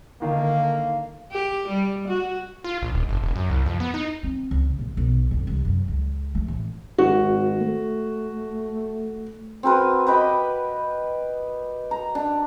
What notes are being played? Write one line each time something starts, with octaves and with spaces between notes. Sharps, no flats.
D3 D#3 A#3 F5
G4
G3
F#4
F4
A#1
D#1
F#1
E1
F#2
C2
F2
B3
D#4
C4
C#2
A#1
B1
F2
C2
F#2
C#2
A3
A1
G#1 F#4
A3
C4 F#4 A#4 B4
G4 B4 D#5 B5
A#5
D4